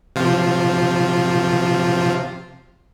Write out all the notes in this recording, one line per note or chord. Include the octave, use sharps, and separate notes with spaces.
C3 F3 F4